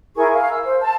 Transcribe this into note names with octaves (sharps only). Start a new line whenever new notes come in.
E4 G#4 A#4 C#6
F5
E6
C5
A5